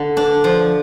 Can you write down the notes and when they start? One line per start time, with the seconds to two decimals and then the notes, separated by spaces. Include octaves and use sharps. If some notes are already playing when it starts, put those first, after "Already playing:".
Already playing: D3
0.17 D4
0.44 F3